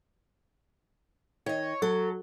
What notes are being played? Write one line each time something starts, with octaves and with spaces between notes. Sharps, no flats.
D#3 C#5 D#5
F#3 A4